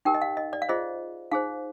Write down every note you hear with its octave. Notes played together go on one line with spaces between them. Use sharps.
D#4 G4 A#4 G5
D#5
F5
D#5
D5
F5
F4 G#4 C5 D#5
D#4 G#4 C5 F5